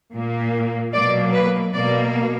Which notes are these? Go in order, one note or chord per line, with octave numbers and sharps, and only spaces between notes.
A#2 A#3
B2 F#3 A#3 D5
B4
B2 A#3 D5